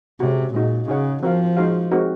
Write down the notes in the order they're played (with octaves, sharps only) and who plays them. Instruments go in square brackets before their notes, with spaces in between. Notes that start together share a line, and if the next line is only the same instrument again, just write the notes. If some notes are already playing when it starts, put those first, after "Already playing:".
[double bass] C3 [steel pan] G#3 C#4 F#4
[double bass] A#2 [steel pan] G#3 D#4 F#4
[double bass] C#3 [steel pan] D#4 G#4 C#5 F#5
[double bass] F3 [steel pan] C4 F#4 A#4 F5
[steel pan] G#3 D#4 F#4 C5 F5
G#3 C4 D#4 F#4 A#4